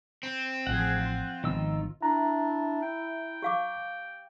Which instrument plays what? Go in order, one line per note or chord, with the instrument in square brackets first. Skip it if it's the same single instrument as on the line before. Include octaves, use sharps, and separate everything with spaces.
[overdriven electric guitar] C4
[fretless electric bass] A1 [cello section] F3 G#4 [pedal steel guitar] F#5
[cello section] F4
[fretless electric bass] G#1 F3 B3 [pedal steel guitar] D#3 E6
[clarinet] D4 [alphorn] E4 [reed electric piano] A#5
[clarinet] G5
[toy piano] G4 F5 D6